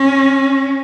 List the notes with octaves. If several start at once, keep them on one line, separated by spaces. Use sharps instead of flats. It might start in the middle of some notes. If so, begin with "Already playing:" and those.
Already playing: C#4